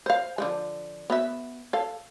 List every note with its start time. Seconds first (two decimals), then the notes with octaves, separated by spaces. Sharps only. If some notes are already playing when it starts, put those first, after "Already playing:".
0.06 C5 F5
0.38 D3 F3 G#3
1.10 B3 F#4 E5
1.73 A4 F5